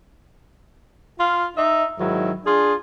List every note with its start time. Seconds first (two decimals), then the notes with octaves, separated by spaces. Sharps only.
1.18 F4 F5
1.55 D#4 E5
1.99 G#2 D#3 F#3 E4
2.45 D4 F4 G#4